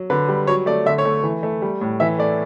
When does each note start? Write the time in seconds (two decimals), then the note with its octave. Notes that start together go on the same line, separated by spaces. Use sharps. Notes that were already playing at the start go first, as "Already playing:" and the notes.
Already playing: F#3
0.10 D3 B4
0.28 G3
0.47 F#3 C#5
0.66 A3 D5
0.86 D3 E5
0.98 C#5
1.05 A3
1.23 E3
1.43 A3
1.62 G3
1.81 A2
2.00 E3 E5
2.19 A3 D5